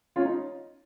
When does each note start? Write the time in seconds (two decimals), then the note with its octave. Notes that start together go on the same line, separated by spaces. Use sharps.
0.16 C#4 F4
0.25 D#4